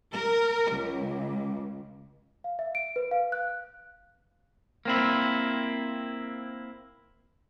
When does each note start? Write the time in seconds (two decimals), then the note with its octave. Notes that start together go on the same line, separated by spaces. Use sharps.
0.12 A#4
0.71 C#2
2.44 F5
2.59 E5
2.75 D7
2.96 B4
3.11 F5
3.32 F#6
4.85 A#3 C4 E4